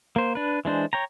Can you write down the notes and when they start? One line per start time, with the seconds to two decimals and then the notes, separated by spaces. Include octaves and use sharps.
0.16 A#3 C5
0.35 D4 B4
0.65 E3 G#3 D4 C5
0.93 C#5 G5 A#5